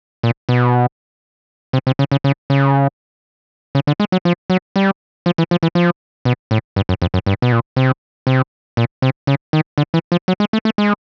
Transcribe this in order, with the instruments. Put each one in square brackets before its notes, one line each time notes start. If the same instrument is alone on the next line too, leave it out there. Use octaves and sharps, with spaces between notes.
[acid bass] A#2
B2
C3
C3
C#3
C#3
C#3
C#3
C#3
D3
G#3
F#3
F3
F#3
G3
F3
E3
F3
E3
F3
B2
A2
G2
F#2
F2
F#2
G2
B2
A#2
C3
C3
A#2
C3
C#3
D#3
D3
E3
F3
F#3
G#3
A3
A3
G#3